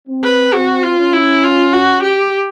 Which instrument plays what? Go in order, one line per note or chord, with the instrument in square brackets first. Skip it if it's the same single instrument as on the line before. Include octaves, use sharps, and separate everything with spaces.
[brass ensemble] C4
[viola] B4
[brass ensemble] C4 [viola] F#4
[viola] F4
[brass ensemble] C#4
[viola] E4
F4
F#4
G4